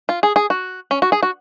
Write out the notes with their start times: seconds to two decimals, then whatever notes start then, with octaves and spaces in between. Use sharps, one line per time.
0.09 F4
0.23 G#4
0.36 G#4
0.50 F#4
0.91 C#4
1.02 F#4
1.12 G#4
1.23 F#4